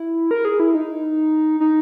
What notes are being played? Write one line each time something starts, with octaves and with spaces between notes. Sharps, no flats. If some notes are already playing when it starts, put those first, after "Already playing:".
Already playing: E4
A#4
G#4
E4
D#4
D#4